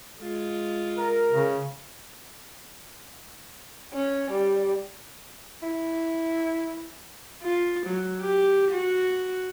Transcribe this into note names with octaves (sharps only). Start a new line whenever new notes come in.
G#3 F4
A#4
C#3
C#4
G3
E4
F4
F#3
G4
F#4